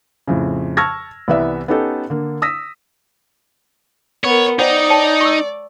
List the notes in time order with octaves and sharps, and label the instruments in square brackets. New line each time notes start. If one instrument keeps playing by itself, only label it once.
[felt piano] F2 A2 C#3
A5 C#6 E6 F6 G#6 A#6
C2 E3 B3 D5 E5
B3 C#4 D#4 G4 A4
D3 A#3
D#6 E6 A#6 B6
[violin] B3 A#4 [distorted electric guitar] C#5
[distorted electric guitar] D#4 [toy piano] C5 F#5 G5 [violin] D5
[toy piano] C#5 G5 A5
C#6 E6